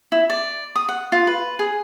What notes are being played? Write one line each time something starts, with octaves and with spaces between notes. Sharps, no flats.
E4
D5
D#6
F#5
F4
B4
G#4